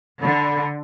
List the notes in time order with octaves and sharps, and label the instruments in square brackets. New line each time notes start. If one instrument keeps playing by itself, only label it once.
[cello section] D3 [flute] B5